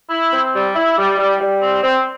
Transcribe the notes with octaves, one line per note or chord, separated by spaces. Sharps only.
E4
C4
G3
E4
G3
G3
G3
C4
C4